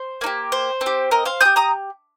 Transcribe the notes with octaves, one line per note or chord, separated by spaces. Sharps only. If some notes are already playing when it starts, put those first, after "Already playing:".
Already playing: C5
A#3 D#4
G4
C5
C4
G4
A#4 D#5
C5 F5
C4 G4 D#6 G6
A#5 D#6